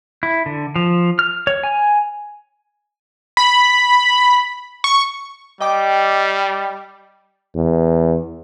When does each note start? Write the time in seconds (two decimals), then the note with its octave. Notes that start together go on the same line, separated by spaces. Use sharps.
0.23 E4
0.46 D3
0.76 F3
1.19 F6
1.47 C#5
1.64 G#5
3.37 B5
4.84 C#6
5.61 G3 D#5 G5 D6
7.55 E2